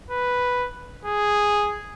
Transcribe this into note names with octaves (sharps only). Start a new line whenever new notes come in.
B4
G#4